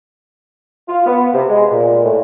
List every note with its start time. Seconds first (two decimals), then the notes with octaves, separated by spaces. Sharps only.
0.89 F4
1.07 B3
1.34 C3
1.49 G#3
1.71 A#2
2.05 A2